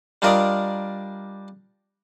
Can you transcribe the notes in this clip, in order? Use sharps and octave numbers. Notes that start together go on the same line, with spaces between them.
G3 D4 F4 A#4 D5 D#5